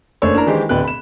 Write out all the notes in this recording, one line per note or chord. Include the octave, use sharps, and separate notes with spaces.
F#1 A3 D4 C5 C#5 E6
D4 E4 A#4 A#5
D#3 E3 G#3 G4 C5
D1 B2 D3 B4 G5 F#6
B5 E7